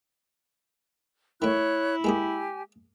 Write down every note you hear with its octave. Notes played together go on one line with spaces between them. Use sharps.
D#3 A3 E4 C#5 F#6
G#3 A#3 G4 G#4 G#5